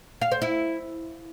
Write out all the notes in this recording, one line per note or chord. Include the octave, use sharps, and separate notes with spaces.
F5
C5
E4